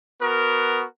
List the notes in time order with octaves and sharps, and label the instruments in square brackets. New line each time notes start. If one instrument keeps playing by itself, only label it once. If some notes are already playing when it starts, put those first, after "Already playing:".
[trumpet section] B3 F#4 A#4